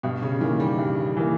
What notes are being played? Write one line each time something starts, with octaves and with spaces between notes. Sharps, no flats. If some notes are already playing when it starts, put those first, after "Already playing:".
G2 B2
C#3
D#3 E3 A#3
G3
G2
E3 A#3